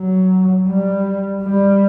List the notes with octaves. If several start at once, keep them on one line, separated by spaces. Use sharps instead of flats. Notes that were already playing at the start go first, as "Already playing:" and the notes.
Already playing: F#3
G3
G3